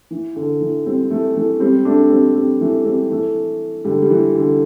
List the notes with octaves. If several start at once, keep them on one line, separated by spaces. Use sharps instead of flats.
E3
D3
E3
G3 C4
E3 A3
E3 A3
G3 C4
A3 D4
G3 C4
G3 C4
E3 A3
G3 C4
E3 A3
D3 G3
G3
E3
D3